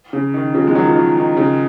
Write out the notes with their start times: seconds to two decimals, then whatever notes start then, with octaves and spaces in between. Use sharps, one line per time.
0.13 C#3
0.34 D#3
0.54 C#3 F3
0.67 G#3
0.75 D#3 F#3
0.86 F3
0.95 D#3
1.16 D#3
1.37 C#3